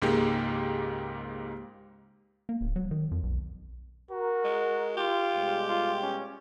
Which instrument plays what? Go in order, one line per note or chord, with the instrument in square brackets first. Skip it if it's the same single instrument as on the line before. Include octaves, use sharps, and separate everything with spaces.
[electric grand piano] C#2 G#2 G#3 A#3 G4 G5
[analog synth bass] A#3
D1
F#3
D#3
F2
B1
[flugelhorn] F#4 [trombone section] A#4
[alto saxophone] G#3
[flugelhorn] F4 [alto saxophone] G4
[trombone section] B2 G3 G#3
[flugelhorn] F4
C#4